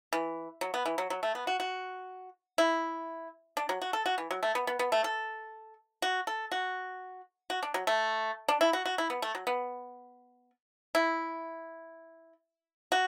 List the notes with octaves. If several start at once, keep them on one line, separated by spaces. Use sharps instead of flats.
E3
F#3
B3
E3
F#3
F#3
A3
B3
F#4
F#4
E4
D4
F#3
F#4
A4
F#4
E3
F#3
A3
B3
B3
B3
A3
A4
F#4
A4
F#4
F#4
D4
F#3
A3
D4
E4
F#4
F#4
E4
B3
A3
F#3
B3
E4
F#4